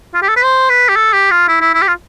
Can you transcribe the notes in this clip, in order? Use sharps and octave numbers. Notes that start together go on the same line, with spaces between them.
F4
G4
A4
B4
C5
B4
G4
A4
G4
F4
E4
E4
E4
G4
F4